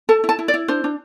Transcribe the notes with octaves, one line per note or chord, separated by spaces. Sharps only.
A4 A5
E4
A5
E4
D5
E4
D4 C5
D4